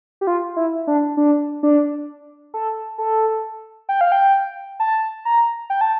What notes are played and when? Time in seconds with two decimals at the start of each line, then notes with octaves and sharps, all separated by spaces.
0.21 G4
0.27 F4
0.56 E4
0.87 D4
1.17 D4
1.63 D4
2.54 A4
2.98 A4
3.89 G5
4.01 F5
4.12 G5
4.80 A5
5.25 A#5
5.70 G5
5.81 A5